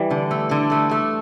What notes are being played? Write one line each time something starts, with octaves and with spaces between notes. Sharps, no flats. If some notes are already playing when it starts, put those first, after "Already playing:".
Already playing: E3 G3
D3
A3
D3
A3
A3